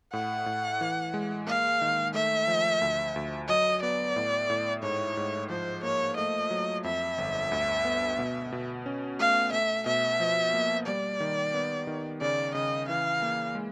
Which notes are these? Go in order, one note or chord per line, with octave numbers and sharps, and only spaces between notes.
A2 F#5
A2
E3
G#3
A#3 F5
D#3
A3 E5
F3
D2
D2
F#3 D#5
B3 D5
A2
A2
G#2 C#5
G#2
F3 C5
A#3 C#5
A3 D#5
F#3
F2 E5
G1
D2
B3
B2
B2
C#4
A3 F5
A3 E5
B2 E5
F3
A#3
G3 D5
D#3
B3
D#3
C#3 D5
C#3 D#5
E3 F5
A#3
G#3